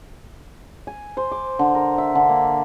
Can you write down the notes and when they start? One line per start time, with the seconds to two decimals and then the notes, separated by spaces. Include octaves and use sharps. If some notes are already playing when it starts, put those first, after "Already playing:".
0.87 G#5
1.17 C5
1.32 D6
1.59 D3
1.75 A#4
1.98 E5
2.15 D3
2.29 A#3